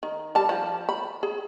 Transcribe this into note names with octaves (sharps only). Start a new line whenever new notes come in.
D#3
G3 A5
F3
B5
G#4